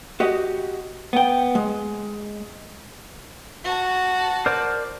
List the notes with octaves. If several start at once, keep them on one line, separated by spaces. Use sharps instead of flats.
F#4 G4 D#5
B3 G5
G#3
F#4 A5
A#4 C5 D5